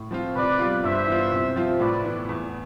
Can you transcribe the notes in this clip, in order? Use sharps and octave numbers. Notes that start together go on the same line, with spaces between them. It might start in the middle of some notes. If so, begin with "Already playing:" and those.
Already playing: A2
F3 C4 F4
C3 B4 D5
G3 B3 F4
G2 C5 E5
E3 B3 F4
C3
F3 C4 F4
A2 B4 D5
E3 B3
E2